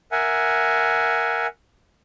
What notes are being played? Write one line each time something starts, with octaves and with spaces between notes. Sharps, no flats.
A#4 E5 F#5 G#5